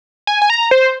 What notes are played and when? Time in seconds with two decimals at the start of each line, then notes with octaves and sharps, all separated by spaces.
0.27 G#5
0.42 G#5
0.50 A#5
0.71 C5